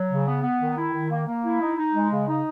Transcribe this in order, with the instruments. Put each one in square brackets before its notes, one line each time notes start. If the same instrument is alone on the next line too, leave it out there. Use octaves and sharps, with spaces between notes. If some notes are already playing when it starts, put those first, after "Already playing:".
Already playing: [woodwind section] F#3
C#3
B3
B3
D#3
E4
D#3
A#3
A#3
E4
D#4
D#4
G#3
C#3
D#4